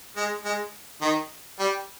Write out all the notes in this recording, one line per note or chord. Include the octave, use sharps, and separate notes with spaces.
G#3
G#3
D#3
G3